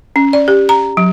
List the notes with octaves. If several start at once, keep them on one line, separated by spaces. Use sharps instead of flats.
C#4
D5
G4
A#5
F#3